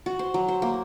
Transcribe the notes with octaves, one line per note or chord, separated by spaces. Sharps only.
F#4
C5
F#3
C5
A#3